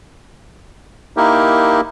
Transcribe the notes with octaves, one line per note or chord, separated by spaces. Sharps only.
A#3 D#4 E4 G4 A#4